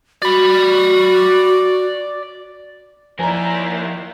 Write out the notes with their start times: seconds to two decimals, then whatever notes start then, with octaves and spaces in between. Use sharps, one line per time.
0.22 F#4 D5 B5
3.19 D#2 F3 E4 A#4 D5 G#5 A#5